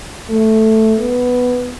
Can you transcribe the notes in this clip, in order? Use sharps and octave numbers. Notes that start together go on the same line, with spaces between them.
A3
B3